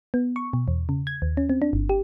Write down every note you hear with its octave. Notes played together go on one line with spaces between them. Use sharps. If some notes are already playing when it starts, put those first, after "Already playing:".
B3
C#6
B2
E2
C#3
G#6
D#2
C#4
C4
D4
G1
G4